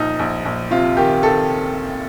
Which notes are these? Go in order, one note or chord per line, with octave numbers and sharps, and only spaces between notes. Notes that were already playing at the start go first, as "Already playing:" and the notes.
Already playing: A#1 D#4
A#1
A#1
C3 F4
D#3 G4
D#3 A4